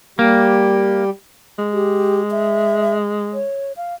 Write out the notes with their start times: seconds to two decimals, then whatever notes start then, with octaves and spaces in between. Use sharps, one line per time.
0.19 G3 A#3 G4
1.58 G#3
1.73 G4
2.31 E5
3.33 C#5
3.77 F5